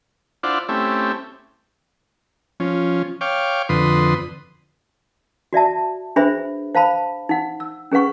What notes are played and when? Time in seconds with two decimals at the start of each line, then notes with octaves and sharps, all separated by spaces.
0.43 D4 E4 F4 C5 D5 F#5
0.69 A3 C4 C#4 E4 G4
2.60 F3 C#4
3.21 C#5 F5 G5 D6
3.69 F2 D3 B4 C6 D#6
5.53 F#4 D5 E5 A5
6.16 D4 G#4 B4 C5 E5 B5
6.75 C5 F5 A5 B5
7.29 D#4 F#5
7.60 E6
7.91 C#4 G#4 B4 F#5 C#6